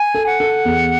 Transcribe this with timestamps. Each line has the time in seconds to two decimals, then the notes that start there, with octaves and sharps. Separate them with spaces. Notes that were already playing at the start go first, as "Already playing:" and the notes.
Already playing: G#5
0.15 A4
0.26 F#5
0.40 A4
0.65 E2